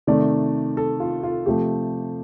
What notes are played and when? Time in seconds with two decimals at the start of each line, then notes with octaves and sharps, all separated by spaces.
0.07 C3 D#3 A3 D5
0.77 A4
1.00 F4
1.23 F4
1.46 C3 F3 A3 G4